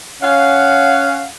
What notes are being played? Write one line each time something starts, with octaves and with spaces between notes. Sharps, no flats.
C#4 F5 F#5